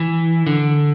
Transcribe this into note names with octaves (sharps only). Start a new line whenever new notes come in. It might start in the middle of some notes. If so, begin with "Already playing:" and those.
Already playing: E3
D3